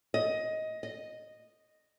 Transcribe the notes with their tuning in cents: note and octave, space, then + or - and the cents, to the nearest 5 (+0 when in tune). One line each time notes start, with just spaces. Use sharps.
D#5 +15
D#5 -5